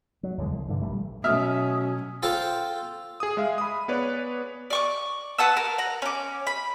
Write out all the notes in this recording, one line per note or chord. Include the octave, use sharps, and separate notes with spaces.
F#3
E2 D3 G#3
C2
G2 D3 E3
A#1 G3 A3
B2 F#3 A3 C#4 E5 D#6 F6
F4 A4 C5 G5 A#5
G#4 D#6
G#3 G#4 E5 F5
B5 D#6
B3 G#4 B4 C#5 D5
D5 C#6 D6
B4 F#5 A5 E6
A#4
F#5 A#5
C#4 D6
B5